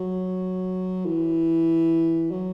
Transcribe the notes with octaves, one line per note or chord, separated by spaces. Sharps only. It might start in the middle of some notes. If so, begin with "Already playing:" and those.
Already playing: F#3
E3
F#3